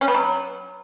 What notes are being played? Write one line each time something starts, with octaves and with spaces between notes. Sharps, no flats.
C#4
B3
F#3